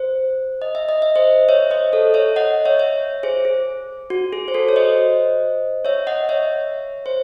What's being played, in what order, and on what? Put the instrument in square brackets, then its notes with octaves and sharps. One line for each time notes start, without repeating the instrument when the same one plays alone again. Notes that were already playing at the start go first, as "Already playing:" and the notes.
Already playing: [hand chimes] C5
D#5
E5
D#5
E5
C5 D#5
C#5 E5
C5 D#5
A4 C#5
C#5 E5
D#5 F#5
C#5 E5
C#5 E5
G#4 C5
G#4
F#4
G#4
C5
F#4 A4
C#5
C5 D#5
C#5 E5
D#5 F#5
C#5 E5
C5